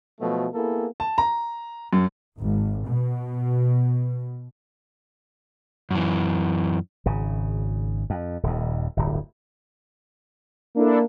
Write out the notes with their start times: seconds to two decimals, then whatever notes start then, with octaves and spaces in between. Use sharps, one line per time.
0.20 B2 F3 F#3 A3
0.54 A#3 B3 E4 G#4 A4
1.00 A5
1.18 A#5
1.93 F#2
2.40 G#1
2.88 B2
5.91 F#2 E3
7.06 G#1 C#3
8.10 F2
8.43 D#1 D#2
8.97 D1 G1
10.76 A#3 D4 E4 A4